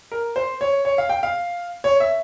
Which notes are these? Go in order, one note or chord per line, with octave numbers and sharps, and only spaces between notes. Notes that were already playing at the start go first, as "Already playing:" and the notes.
A#4
C5
C#5
C#5
F5
G5
F5
C#5
E5